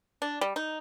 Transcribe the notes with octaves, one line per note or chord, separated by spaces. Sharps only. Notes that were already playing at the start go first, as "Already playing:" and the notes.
D4
G3
D#4